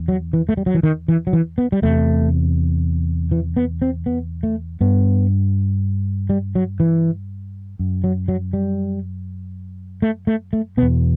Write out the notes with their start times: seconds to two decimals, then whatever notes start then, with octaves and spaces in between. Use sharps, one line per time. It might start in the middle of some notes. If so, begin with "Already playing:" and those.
Already playing: E2
0.08 F#3
0.33 E3
0.49 A3
0.57 G3
0.66 F#3
0.75 E3
0.83 D#3
1.08 E3
1.27 F#3
1.33 E3
1.58 B3
1.72 G3
1.82 E2 C3 A3
3.31 E3
3.57 B3
3.82 C4
4.06 B3
4.43 A3
4.81 G2 B3
6.30 G3
6.55 F#3
6.80 E3
7.79 F#2
8.04 F#3
8.28 F#3
8.53 G3
10.02 A3
10.27 A3
10.53 A3
10.77 B2 B3
10.82 E2